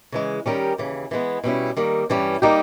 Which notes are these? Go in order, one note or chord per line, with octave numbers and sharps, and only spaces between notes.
C#3 E3 G#3
D#3 G3 C#4 G4 A#4
D#2 C#3 E3
E3 G#3 B3
B2 G3 C#4 E4
D#3 G3 A#3
G2 E3 G3 C#4
G3 A#3 D#4 G4